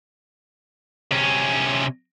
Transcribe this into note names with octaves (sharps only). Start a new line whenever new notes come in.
C3 C#4